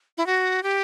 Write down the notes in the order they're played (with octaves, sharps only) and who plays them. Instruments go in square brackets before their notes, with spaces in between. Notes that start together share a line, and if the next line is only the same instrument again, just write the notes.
[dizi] E4
F#4
G4